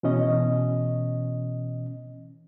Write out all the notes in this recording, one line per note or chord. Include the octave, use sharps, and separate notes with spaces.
B2 E3 C#4 D#5